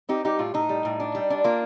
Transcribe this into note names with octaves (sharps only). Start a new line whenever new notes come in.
C4 D#4 G4
G3 D#4 G4
A2 F4
A2 D#4
G3
A2
D4
G3
D4
A#3 F4